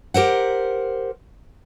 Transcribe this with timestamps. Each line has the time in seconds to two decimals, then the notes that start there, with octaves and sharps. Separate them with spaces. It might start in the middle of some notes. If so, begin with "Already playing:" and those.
0.14 G4 A#4 C5 F#5